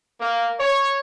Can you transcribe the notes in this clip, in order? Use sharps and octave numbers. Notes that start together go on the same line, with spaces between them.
A#3
C#5